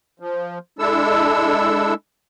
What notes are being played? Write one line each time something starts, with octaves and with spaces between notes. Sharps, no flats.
F3
G#3 D4 E4 A4 E6